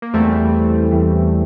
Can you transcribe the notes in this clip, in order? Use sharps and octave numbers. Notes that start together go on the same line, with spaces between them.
A#3
E2 E3 G3 A3 C4
E2 E3 G3